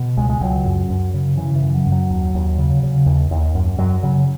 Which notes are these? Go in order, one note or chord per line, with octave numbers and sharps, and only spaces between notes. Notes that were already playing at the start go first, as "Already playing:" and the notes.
Already playing: B2
C#2 G#3
G#3
C#2 F#3
F#2
F#2
C#3
C#3 E3
E3
F#2
F#3
F#2
F#3
D#2
D#2
C#3
C#3
D#2
D#2
F#2
F#2 F#3
C#3 F#3